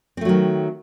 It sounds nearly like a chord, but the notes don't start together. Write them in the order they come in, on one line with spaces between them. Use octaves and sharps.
C4 A3 F#3 D#3